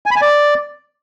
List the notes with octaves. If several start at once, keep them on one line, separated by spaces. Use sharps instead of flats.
G#5
B5
G#5
D5